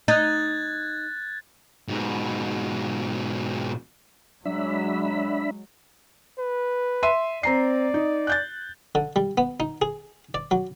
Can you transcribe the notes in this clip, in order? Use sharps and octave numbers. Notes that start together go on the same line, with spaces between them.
D#4 F#6 G#6 A6
G#2 B2
F#3 G#3 D4 E5 B5
B4
E5 C6 D#7
C4 D5 A#5 C7
D#4
F#6 G6 A6
D3
G3
B3
D#4
G#4
D5
F#3